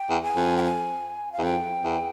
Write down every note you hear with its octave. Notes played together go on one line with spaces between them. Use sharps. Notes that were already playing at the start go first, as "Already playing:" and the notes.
Already playing: G5
E2
G#5
F2
G5
G#5
F5
E2
F2 G5
E2